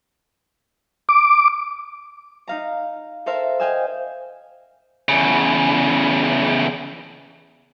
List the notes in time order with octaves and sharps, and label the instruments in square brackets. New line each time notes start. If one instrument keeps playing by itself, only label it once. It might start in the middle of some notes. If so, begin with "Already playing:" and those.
[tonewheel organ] D6
[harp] D#4 F5 A#5
A4 A#4 C5 E5 F5
D#5 F5 G5 G#5 E6
[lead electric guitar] E2 C#3